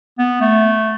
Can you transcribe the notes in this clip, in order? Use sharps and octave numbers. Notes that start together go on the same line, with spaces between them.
B3
A3